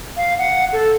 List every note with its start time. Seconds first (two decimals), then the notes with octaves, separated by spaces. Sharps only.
0.17 F5
0.38 F#5
0.73 A4